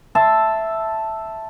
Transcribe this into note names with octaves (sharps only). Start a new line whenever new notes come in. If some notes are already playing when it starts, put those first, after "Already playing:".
E5 A5 C6